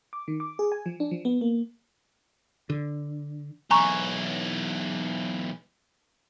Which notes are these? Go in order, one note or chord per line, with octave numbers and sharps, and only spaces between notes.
D6
D#3
D6
G#4
G#5
F3
D4
F3
B3
A#3
D3
B1 E3 G#5 A#5 C#6